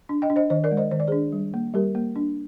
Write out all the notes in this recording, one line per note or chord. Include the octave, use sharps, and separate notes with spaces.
D4
D#5 G5
D4
C5 D#5
D#3 C5 D#5
A#4 D5
G#3
C5 D#5
D#3 C5
D5
D4 G#4 C5
G3
A#3
G3 G4 A#4
A#3
D4